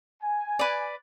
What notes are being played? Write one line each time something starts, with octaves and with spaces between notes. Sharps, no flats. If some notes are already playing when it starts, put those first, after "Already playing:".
G#5
B4 D5